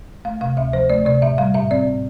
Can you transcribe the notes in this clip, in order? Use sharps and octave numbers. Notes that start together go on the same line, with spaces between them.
A3 F5
C3 F5
D2 E5
F3 C5
A3 D5
C3 D5
A2 E5
G3 F5
A2 E5
C4 D5
A2